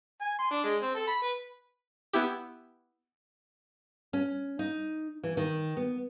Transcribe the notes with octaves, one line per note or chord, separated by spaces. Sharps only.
G#5
C6
D4
G#3
C4
A4
B5
B4
B3 E4 G4
C#4
D#4
E3
D#3
B3